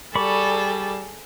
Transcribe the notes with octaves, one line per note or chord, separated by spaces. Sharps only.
G3 G#4 A4 D5 B5 C#6